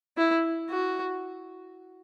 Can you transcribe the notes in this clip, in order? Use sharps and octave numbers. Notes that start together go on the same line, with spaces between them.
E4
F#4